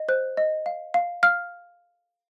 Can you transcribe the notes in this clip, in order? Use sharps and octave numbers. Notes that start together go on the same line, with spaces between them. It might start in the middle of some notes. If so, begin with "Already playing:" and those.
Already playing: D#5
C5 F#6
D#5
F5
F5
F5 F6